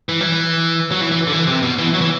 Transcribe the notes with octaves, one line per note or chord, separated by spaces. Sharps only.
E3
F#3
E3
F#3
E3
E3
D3
E3
C3
B2
E3
F#3
E3